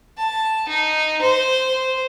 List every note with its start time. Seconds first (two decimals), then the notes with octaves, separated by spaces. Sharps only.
0.18 A5
0.68 D#4
1.21 C5